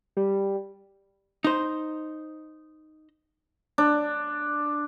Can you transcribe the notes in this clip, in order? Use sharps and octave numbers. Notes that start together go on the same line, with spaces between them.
G3
D#4 C5
D4